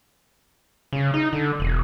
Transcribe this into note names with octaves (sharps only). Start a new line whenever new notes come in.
C#3
D#4
D3
E1